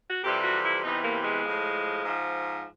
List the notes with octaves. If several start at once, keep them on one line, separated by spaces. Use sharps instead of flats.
F#4
F2 C3 E3 G3 G4
F#4
E4
E2 C3 E3 G3 D#4
A#3
G#3
A2 F3
G#2 F3